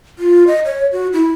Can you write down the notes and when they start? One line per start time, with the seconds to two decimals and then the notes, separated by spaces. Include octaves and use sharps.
0.19 F4
0.47 D#5
0.65 C#5
0.92 F#4
1.13 E4